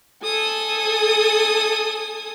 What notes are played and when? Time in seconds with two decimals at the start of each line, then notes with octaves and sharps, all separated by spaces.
0.24 A4 G#5 D#6